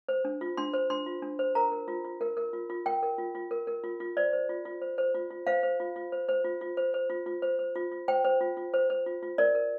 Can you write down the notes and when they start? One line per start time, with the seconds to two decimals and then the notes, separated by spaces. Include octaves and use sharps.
0.08 C5
0.25 D4
0.41 F4
0.57 D4 C6
0.74 C5
0.90 D4 C6
1.06 F4
1.22 D4
1.39 C5
1.55 A#4 A#5
1.72 A#4
1.88 F4
2.05 F4
2.21 A#4
2.37 A#4
2.53 F4
2.70 F4
2.86 A#4 G5
3.02 A#4
3.18 F4
3.35 F4
3.51 A#4
3.67 A#4
3.84 F4
4.00 F4
4.17 C5 D5
4.33 C5
4.49 F4
4.65 F4
4.82 C5
4.98 C5
5.15 F4
5.31 F4
5.47 C5 F5
5.63 C5
5.80 F4
5.96 F4
6.12 C5
6.29 C5
6.44 F4
6.61 F4
6.77 C5
6.94 C5
7.10 F4
7.26 F4
7.42 C5
7.59 C5
7.75 F4
7.92 F4
8.08 C5 G5
8.25 C5
8.41 F4
8.57 F4
8.74 C5
8.90 C5
9.06 F4
9.23 F4
9.38 A#4 D5
9.55 A#4